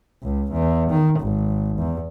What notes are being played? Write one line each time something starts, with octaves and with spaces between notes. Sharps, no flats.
C#2
E2
D#3
G#1
E2